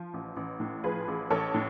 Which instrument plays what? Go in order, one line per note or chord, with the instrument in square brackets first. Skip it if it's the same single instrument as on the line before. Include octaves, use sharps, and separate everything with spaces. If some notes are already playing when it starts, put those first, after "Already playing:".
Already playing: [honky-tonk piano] F3
A1
A1
A2
F3 G#4 B4
A1
A1 A4 C#5
A2